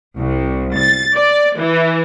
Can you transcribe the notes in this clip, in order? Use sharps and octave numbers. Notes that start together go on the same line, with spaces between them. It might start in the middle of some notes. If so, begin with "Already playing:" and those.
C2
A6
D5
E3